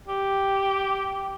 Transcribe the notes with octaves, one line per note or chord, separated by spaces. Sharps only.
G4